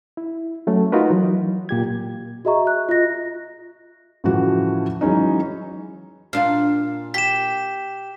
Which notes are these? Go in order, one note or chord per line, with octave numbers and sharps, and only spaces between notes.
E4
F#3 A3 C#4
D#4 F4 F#4 A#4 B4
E3 F#3
A#2 G4 G#6
F#4 G#4 D#5 E5 A#5 C#6
F#6
F4 D#5 A#6
A2 C#3 E3 F3 F#4
E3 F#3 G#3 C#4 D#4
A#2 D4 F4 F5
G4 B6 E7